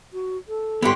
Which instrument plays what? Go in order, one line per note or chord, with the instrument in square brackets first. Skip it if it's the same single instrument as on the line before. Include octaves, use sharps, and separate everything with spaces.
[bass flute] F#4
A4
[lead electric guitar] G2 B3 [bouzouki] D3 E4 G4 [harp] G#4 C#5 C6